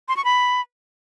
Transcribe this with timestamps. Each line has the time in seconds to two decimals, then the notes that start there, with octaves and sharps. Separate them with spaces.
0.08 C6
0.16 C#6
0.25 B5